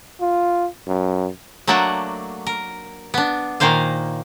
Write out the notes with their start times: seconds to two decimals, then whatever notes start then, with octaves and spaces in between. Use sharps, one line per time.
0.21 F4
0.87 F#2
1.67 F#3 A3 A#3 D4 F#4 F#5
2.47 A#4
3.14 B3 D4
3.60 A#2 D#3 A#3 C5 F5